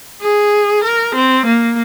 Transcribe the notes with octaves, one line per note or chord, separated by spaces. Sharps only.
G#4
A#4
C4
A#3